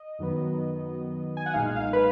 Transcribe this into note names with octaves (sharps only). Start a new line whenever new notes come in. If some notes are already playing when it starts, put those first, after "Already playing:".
Already playing: D#5
F#2 D#3 F#3 B3
G#5
F#5
B1 A#2 G#3 D#4 F5
F5
B4